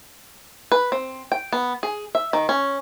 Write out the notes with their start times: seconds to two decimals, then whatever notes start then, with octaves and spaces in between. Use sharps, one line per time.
0.72 B4
0.92 C4
1.32 G5
1.53 B3
1.83 G#4
2.15 E5
2.33 D#3
2.49 C#4